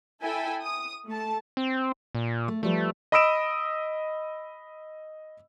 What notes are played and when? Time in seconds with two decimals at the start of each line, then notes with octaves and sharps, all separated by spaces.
0.23 E4 A4 E5 G5 G#5
0.63 D#6
1.07 A3 A5
1.57 C4
2.15 A#2
2.48 A3
2.63 F3 G3 A3 B4
3.12 D#5 B5 D#6 E6 D7 E7